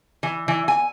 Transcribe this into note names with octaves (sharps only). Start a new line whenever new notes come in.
E3
E3
G#5